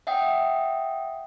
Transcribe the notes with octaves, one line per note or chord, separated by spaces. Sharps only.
E5 F#5 G5 D#6